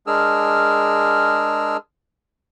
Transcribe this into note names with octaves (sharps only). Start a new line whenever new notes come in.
G#3 D4 G#4 A#4 E6 F6